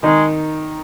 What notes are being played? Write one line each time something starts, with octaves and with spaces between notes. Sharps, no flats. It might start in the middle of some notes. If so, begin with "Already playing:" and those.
D#3 G#3 D#4